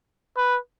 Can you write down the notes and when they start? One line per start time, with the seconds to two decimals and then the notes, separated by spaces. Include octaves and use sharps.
0.37 B4